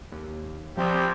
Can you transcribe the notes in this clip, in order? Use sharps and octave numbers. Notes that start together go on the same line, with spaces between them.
D#2
C2 F3 C4 G4